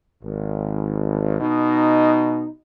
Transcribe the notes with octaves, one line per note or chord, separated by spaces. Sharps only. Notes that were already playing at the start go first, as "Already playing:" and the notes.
G#1
B2 D#4